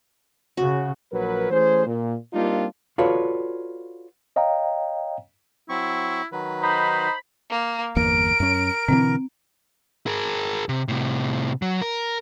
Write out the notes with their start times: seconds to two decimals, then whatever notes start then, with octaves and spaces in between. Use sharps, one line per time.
0.57 C#3 F#4
1.12 A#1 F#3 A#4 B4
1.50 E3 A3 C#4 G#4 C5
1.86 A#2
2.33 G3 A#3 C4 D4 D#4 F4
2.98 F4 F#4 A4 B4 C#5 D5
4.36 C#5 D#5 F5 G5 A#5
5.69 F#3 C4 E4 C#6
6.32 D#3 F#3 B4
6.62 D#4 C5 B5
7.50 A#3
7.96 G1 E2 A#3 A#4 D7
8.40 F#2 C#4
8.88 B2 D3 E3 C4
10.07 G#4 A#4
10.69 C3
10.88 A2 C3
11.62 F#3
11.81 A#4